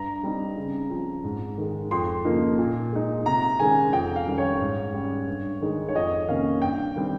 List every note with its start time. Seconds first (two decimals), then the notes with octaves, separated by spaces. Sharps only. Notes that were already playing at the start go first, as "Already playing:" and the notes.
Already playing: G2 A#5
0.23 G3 C4 D#4
0.56 C#3
0.90 F3 C4
1.24 G#2
1.58 D#3 G#3
1.91 F2 C6
2.25 C#3 F3 A#3 D#4
2.58 A#2
2.92 G#3 D#4
3.26 C3 A#5
3.59 D#3 G#3 C#4 G#5
3.93 F2 G5
4.16 F5
4.27 D#3 G3 C#4
4.38 C#5
4.61 G#2
4.94 G3 C#4
5.28 G2
5.61 D#3 G#3 D#4
5.88 C#5
5.95 F2 D#5
6.28 C3 D#3 A#3 C#4 F5
6.62 G2 G5
6.95 D#3 G3 C4